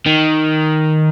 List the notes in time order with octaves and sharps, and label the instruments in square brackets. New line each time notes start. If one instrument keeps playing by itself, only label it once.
[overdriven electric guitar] D#3